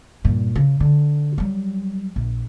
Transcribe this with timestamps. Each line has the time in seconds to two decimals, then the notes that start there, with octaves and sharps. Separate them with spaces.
0.25 G2 A#2
0.55 C#3
0.80 D3
1.38 F#3 G3
2.16 A#1